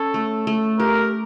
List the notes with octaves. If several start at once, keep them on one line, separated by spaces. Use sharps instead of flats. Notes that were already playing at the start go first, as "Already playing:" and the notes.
Already playing: C#4 A4
A3
A3
G4 A#4